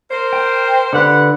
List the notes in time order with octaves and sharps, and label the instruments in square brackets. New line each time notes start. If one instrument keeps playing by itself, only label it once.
[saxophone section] A#4 C5
[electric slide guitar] G5
[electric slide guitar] D3 B4 [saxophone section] G4 F#5